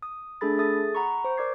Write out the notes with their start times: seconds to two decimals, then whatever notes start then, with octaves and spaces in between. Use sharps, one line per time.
0.03 D#6
0.41 A3 D4 G#4 A4 B5 A6
0.58 G#4 A4 E5 D#6 A6
0.95 F#5 A#5 B5 C#6
1.24 C5 C#6
1.37 A#4 D5 D6 G#6 C7